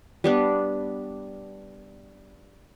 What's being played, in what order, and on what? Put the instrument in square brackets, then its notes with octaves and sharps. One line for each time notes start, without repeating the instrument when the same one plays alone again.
[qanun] G3 B3 D4